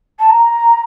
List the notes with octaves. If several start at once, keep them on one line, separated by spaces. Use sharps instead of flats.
A5
A#5